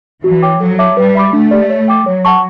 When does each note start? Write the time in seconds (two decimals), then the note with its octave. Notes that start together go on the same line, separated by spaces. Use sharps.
0.24 E3 F#4
0.42 C#5 G5 D6
0.60 F#3 A4
0.79 C#5 E5 A5 D6
0.97 G3 B4
1.15 E5 B5 D6
1.33 A3 D4
1.51 G4 D5
1.70 C#5
1.88 G5 D6
2.06 F#3 C#5
2.25 F#5 A5 C#6